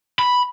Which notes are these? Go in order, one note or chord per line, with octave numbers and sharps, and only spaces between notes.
B5